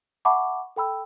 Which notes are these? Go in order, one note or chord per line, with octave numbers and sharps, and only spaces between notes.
E5 F#5 A5 B5 C#6 D6
A4 G5 B5 E6